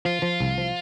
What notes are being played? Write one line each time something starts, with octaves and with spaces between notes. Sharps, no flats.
F3 F4
F3
C2
F3